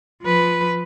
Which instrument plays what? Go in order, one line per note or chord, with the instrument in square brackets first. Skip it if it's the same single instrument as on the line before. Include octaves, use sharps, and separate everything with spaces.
[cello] F3 B4